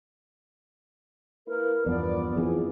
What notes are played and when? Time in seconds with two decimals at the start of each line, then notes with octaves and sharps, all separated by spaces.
1.47 A#3 E4 A#4 B4
1.86 E2 G2 F3 B3 D5
2.35 F2 E3 F3 G#4